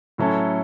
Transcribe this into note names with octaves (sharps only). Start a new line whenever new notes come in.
A2 F#3 C#4 E4 A4